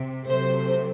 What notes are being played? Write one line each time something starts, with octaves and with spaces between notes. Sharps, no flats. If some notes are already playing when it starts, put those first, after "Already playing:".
Already playing: C3
C3 F#3 A3 C5